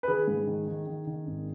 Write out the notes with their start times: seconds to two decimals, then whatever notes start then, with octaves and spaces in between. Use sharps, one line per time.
0.03 B4
0.08 D#3 G#4
0.28 G#2
0.47 D#3
0.67 D#3
0.87 D#3
1.07 D#3
1.27 G#1